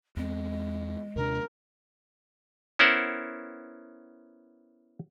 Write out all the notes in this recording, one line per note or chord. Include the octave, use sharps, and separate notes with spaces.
E2 G#3 C4
D#2 C3 D4 A#4
B3 C#4 E4 A#4 C5 F#5